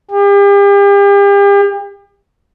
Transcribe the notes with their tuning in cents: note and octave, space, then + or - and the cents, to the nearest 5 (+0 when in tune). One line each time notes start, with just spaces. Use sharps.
G4 +40